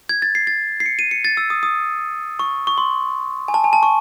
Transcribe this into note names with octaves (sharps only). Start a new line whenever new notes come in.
G#6
A6
C7
A6
C7
C#7
D#7
C#7
A6
E6
D#6
D#6
C#6
C#6
C6
G#5
A5
G#5
A5
C#6